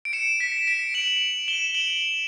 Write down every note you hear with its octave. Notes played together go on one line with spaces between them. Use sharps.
D7
C#7 E7
B6
B6 D7
D7 F#7
E7 G7
E7
D7 F#7